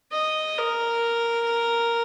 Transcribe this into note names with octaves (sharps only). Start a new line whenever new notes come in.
D#5
A#4